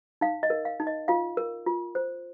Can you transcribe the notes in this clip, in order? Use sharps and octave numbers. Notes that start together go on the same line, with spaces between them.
D#4 F5
D#5
A#4
F5
D#4
D#5
F4 F5
A#4
F4
C5